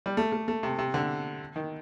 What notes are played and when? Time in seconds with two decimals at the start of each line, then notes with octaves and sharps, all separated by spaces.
0.06 G3
0.17 A3
0.32 A3
0.48 A3
0.63 C3
0.79 C3
0.94 D3
1.56 D#3